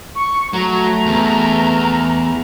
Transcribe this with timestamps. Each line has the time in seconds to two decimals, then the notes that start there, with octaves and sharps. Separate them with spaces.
0.15 C#6
0.54 F#3 A3 A#5
1.06 E2